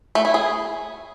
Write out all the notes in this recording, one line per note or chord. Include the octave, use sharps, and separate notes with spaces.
A3
E4
G#4